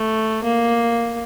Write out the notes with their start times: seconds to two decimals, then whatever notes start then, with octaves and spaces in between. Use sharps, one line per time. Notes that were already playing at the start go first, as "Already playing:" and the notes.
Already playing: A3
0.44 A#3